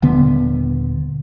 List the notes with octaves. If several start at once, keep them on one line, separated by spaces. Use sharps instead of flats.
D#1 D3 B3